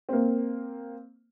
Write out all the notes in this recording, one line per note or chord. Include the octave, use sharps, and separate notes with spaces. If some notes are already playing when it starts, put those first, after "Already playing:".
A#3 C4